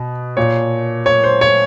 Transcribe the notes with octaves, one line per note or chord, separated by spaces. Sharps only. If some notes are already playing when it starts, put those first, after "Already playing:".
Already playing: B2
A#2 C#5
C#5
C5
C#5